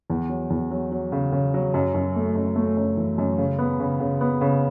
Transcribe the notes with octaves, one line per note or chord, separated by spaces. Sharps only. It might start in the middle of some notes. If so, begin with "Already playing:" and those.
E2
F#3
E2
F#3
F#3
C#3
C#3
F#3
F#2
F#2
A3
F#2
A3
F#2
E3
F#2
C#3
B3
C#3
C#3
B3
C#3